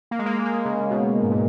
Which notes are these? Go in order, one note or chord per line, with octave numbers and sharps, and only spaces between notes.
A#3
G#3
A#3
G#3
A#3
G#3
C#3
B2
G#2
A#2